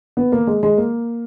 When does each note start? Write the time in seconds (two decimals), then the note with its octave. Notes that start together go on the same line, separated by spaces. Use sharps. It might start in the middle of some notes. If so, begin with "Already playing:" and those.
0.17 B3
0.32 A#3
0.47 G#3
0.63 G#3
0.78 A#3